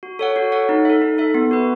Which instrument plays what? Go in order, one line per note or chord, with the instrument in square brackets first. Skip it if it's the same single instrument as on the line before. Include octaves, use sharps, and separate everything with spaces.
[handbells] F#4
A4 C#5 F#5
F#4
A4 C#5 F#5
D#4
A4 E5
D#4
A4 E5
B3
F#4 B4